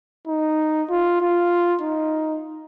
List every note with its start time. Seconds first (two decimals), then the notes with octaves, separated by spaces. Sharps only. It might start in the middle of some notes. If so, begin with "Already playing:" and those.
0.27 D#4
0.90 F4
1.21 F4
1.81 D#4